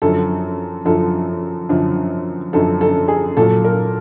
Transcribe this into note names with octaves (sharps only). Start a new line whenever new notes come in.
F#2 D3 F3 A4
F#2 D3 F3 A4
F#2 D3 F3
F#2 D3 F3 A4
A4
G#4
A#2 F#3 A4
A#4